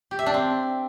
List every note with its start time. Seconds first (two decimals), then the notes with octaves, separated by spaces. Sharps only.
0.11 G4
0.19 E5
0.26 D4
0.34 C4